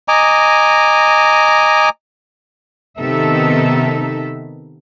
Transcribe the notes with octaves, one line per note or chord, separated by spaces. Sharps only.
D#5 G#5 A#5 D6
C3 D#3 B3 D#4 A4 E5